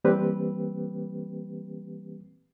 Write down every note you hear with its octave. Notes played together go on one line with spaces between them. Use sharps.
E3 G3 A#3 C4 G4 B4